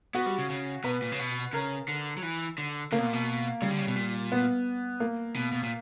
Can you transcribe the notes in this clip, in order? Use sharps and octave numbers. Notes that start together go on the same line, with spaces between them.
B3 F#4
G3
C#3
C#3
B2 B4
A#2
C#3
B2
C#3 A#4
D3
F#3
E3
D3
C#3 A#3
B2
A#2
B2
C#3 G3
D3
C#3
B2
A#2
B3
A#3
B2
B2
A#2